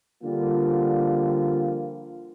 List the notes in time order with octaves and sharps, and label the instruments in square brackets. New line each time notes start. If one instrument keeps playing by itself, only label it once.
[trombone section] D3 F3 G3 A#3 F4